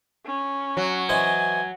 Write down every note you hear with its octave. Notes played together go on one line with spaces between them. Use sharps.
C#4
F#3
E3 C5 D#5 G#5